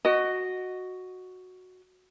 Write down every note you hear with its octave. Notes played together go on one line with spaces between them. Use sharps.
F#4 D#5